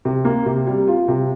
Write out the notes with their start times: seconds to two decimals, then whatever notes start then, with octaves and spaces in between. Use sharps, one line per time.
0.05 C3
0.25 A#3
0.46 C3
0.67 G3
0.87 F4
1.08 C3